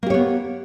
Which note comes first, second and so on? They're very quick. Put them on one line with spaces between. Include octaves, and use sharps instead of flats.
A#3 G4 C#5 B3